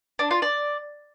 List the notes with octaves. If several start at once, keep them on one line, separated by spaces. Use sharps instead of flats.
D4
F4
D5